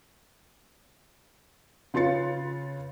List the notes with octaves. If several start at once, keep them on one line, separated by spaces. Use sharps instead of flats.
C#3 F4 B4 C6 A6 C#7